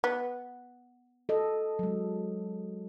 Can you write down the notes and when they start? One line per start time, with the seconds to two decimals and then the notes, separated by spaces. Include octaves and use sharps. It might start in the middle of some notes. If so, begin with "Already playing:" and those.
0.04 B3
1.29 A4 D#5
1.79 F#3 G#3